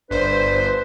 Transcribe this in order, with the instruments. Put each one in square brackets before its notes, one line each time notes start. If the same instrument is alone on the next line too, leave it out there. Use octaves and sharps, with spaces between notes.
[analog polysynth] G1 C5 [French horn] D4 [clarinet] B4